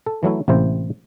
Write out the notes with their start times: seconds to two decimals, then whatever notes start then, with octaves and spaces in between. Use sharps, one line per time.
0.06 A4
0.23 E3 F#3 A3 E4
0.48 A1 C3 A#3 E4 C5